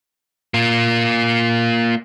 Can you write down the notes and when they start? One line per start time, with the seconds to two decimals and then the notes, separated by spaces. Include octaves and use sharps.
0.54 A#3 F4